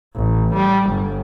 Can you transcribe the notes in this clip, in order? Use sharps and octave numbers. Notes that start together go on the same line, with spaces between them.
A1
G3
G1